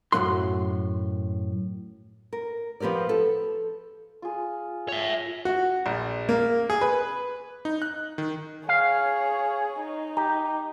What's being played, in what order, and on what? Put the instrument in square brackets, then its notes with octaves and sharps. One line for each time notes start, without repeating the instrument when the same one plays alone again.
[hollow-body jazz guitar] F#2 A2 F#3 B3 F#5 C6
[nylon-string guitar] A#4
F3 B3 G4 A#4 D5
A4
[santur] F4 G#4
[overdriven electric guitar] C#5 E5
[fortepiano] F#4
A#1
A#3
G#4
B4
[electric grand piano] D#4
F#6
D#3
[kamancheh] G#4 C#5 [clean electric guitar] F5
[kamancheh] D#4
[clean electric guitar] G4 [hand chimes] A#5